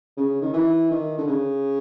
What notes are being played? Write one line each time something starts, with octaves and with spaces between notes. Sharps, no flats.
C#3
D#3
E3
D#3
D3
C#3